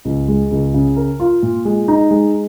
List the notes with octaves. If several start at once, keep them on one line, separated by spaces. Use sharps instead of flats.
C#2
G#3
C#2
C#3
A#4
F4
A#2
G#3
D#4
G#3